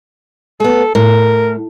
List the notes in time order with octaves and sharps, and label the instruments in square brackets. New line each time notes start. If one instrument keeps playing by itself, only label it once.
[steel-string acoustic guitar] A3 B3 [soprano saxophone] A4
[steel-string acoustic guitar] A2 [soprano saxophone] A#4